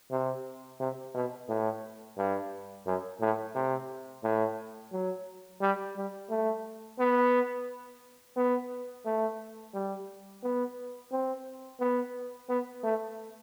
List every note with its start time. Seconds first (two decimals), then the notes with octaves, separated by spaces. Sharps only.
0.11 C3
0.80 C3
1.14 B2
1.49 A2
2.17 G2
2.86 F#2
3.21 A2
3.55 C3
4.24 A2
4.92 F#3
5.61 G3
5.96 G3
6.30 A3
6.99 B3
8.36 B3
9.06 A3
9.74 G3
10.43 B3
11.12 C4
11.80 B3
12.49 B3
12.84 A3